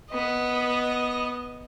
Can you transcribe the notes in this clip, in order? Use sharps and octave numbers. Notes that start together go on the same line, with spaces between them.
B3 D#5